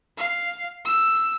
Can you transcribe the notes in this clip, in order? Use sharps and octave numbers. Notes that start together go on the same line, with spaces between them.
F5
E6